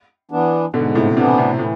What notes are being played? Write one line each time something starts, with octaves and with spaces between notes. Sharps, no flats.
E3 B3 D4
G#2 B2 D3
A2 C3
A2 C3 E3 B3 D4
A2 C3
A2 E3